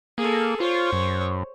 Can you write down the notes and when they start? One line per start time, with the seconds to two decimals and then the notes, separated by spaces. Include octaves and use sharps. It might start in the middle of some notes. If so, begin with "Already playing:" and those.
0.18 A#3 G#4 A4
0.60 F4 C5 C#5
0.93 F#2